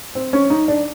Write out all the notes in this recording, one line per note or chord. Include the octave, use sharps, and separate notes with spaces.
C4
C#4
D#4
D4